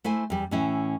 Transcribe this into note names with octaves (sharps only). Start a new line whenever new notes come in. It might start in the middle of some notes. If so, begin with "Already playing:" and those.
A3 E4 C5 G#5
E2 G3
A2 E3 C#4 E4 E5